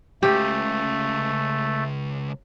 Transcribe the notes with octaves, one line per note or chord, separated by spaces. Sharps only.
C#2 C#3 A3 G4